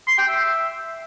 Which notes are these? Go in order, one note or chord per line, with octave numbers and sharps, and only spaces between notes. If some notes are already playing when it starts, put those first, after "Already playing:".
C6
G5
E5